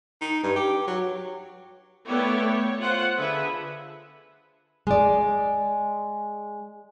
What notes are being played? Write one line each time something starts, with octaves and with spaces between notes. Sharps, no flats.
D#4
G2
G4
F#3
A3 B3 E4 C#5 D5 G5
C#5
F4 C5 F#5
D3 G#4 B4 E5
G#3 D5